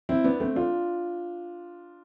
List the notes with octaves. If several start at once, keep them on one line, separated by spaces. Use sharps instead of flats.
C4 E4
B3 D4
A3 C4
D4 F4